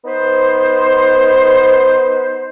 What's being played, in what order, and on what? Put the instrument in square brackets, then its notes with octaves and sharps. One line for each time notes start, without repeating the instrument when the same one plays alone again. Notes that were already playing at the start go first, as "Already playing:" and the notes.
[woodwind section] B3 D#4 B4 C5